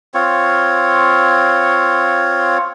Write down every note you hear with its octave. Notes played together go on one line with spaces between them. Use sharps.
C4 F4 C#5